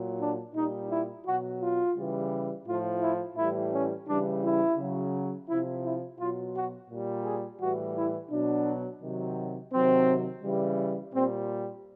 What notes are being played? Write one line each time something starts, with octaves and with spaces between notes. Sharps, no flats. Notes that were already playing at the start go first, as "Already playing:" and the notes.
Already playing: A#2 F#3
D4
A#2 G3 D#4
E4
B2 F#3 F#4
F4
C#3 E3 G3
A2 F3 F4
E4
A2 E3 G3 E4
C#4
C#3 E3 G3 D4
E4
C#3 F#3
C3 F3 E4
E4
B2 F#3 F4
F#4
A#2 G3
G#4
A2 E3 G3 F#4
E4
B2 F#3 D4
C3 D#3 F#3
C3 D#3 F#3 C4
C#3 E3 G3
A#2 G3 C4